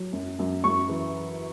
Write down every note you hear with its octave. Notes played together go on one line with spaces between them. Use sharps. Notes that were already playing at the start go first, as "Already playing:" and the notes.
Already playing: F#3
F#2
F#2
F#2 C#6
E3